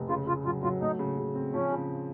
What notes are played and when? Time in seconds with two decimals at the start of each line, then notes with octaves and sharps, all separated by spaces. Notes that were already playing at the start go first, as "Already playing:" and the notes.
Already playing: F1
0.09 C#3 F4
0.27 C#3 F4
0.45 F#3 F4
0.63 F#3 F4
0.81 A3 D#4
0.99 C#3
1.18 C#3
1.35 C4
1.53 F3 C#4
1.72 C#3